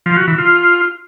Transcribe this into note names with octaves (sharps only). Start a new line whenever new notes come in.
F3
F#4
E3
F4